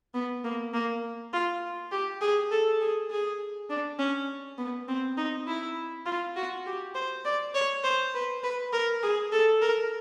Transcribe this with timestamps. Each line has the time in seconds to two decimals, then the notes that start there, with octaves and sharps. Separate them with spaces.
0.14 B3
0.44 A#3
0.74 A#3
1.33 F4
1.92 G4
2.22 G#4
2.51 A4
2.81 G#4
3.11 G#4
3.70 D4
3.99 C#4
4.58 B3
4.88 C4
5.17 D#4
5.47 E4
6.06 F4
6.36 F#4
6.66 G4
6.95 C5
7.25 D5
7.55 C#5
7.84 C5
8.14 B4
8.44 B4
8.73 A#4
9.03 G#4
9.32 A4
9.62 A#4